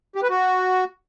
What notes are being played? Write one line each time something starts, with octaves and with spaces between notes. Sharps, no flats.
G4
B4
F#4